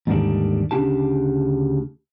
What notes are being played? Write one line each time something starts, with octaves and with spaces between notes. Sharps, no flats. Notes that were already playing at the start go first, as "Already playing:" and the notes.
D#2 G#2 D3 D#3 G3 D4
D2 C#3 D4 G4 A5